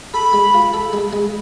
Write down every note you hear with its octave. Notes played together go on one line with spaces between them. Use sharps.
A4 B5
G#3
F4
A4
G#3
G#3